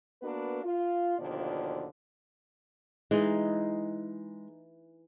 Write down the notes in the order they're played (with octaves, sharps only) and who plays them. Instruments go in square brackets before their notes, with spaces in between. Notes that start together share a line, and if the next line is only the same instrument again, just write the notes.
[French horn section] A#3 B3 D4 F#4 A#4 B4
F4
D#2 B2 D3 F3 F4 D5
[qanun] E3 D#4 [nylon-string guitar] G#3